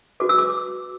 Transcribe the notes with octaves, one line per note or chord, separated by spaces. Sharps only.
F#4 B4 D6
E6
D6